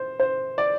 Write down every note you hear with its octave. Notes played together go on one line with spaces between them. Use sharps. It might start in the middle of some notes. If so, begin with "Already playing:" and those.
Already playing: C5
C5
D5